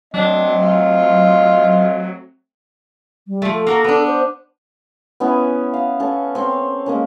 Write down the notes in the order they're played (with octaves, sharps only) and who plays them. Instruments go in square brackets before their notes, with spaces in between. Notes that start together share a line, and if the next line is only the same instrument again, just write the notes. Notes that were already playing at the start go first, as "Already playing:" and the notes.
[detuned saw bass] F#3 [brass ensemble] A3 C4 [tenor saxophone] D4 [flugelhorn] D#5
[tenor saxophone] F4
[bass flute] G3
[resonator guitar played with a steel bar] F3 A3
[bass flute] A4
[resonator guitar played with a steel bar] A#3 F#4 A#4
B3 D4
[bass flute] C5
[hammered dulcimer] B3 C#4 E4 G#5
F5
C#4 A4
C4 C#5 C6
G#3 A#3 C#4